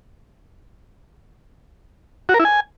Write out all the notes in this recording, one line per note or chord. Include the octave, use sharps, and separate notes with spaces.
F#4
A#4
E4
G#5